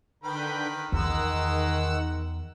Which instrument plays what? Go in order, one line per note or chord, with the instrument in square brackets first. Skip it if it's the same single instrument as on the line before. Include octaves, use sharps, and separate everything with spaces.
[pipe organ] D3 B4 G5 [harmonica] D#3 B5
[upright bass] E2 [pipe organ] D#3 F#5 E6 [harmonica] G#3 A#4